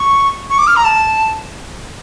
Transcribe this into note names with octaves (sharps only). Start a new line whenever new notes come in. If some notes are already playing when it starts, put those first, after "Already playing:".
Already playing: C#6
C#6
D6
F6
A#5
A5